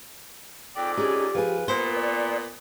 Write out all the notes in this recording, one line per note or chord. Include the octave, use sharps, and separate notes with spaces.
F2 G#2 D5 G5
C#4 D#4 G4 G#4
F3 G#4 B4
A#2 B3 C5
D5